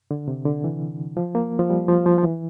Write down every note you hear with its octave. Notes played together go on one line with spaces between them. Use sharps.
D3
C3
D3
E3
F3
A#3
F3
G3
F3
F3
F3
E3